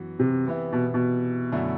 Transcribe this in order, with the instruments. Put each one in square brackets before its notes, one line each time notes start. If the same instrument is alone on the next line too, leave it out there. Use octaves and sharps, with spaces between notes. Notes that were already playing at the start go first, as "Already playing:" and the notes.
Already playing: [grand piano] F#2 E3 B3 F#4
[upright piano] C3
[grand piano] C3 E3 B3 E4
[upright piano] B2
B2
[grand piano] F#2 D3 A3 E4